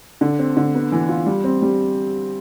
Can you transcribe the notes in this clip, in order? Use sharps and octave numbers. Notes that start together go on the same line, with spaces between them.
D3
C4
D3
B3
E3
F4
G3
C4
G3